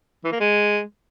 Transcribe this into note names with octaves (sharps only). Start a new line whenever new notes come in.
E3
A#3
G#3